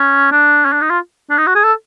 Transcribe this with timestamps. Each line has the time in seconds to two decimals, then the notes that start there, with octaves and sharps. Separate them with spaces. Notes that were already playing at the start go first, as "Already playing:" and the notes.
Already playing: C#4
0.32 D4
0.65 C#4
0.73 D4
0.81 D#4
0.90 F4
1.30 D4
1.38 D#4
1.47 F#4
1.55 G#4
1.64 A4